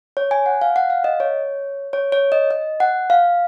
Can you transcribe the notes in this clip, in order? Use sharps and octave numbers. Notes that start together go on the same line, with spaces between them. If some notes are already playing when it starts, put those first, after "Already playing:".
C#5
G#5
F#5
F5
F#5
F5
D#5
C#5
C#5
C#5
D#5
D#5
F#5
F5